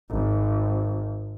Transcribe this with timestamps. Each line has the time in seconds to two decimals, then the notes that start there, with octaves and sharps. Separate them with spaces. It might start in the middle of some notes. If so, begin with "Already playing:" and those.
0.10 G#1